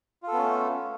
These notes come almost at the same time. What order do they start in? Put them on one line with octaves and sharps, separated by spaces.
F4 A4 B3 C#4 A3